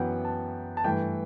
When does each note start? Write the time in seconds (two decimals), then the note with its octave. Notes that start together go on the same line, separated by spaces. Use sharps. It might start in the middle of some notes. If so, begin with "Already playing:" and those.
Already playing: F#2 E3 B3 F#5 G5
0.25 A5
0.77 A5
0.84 G2 E3 A3 G5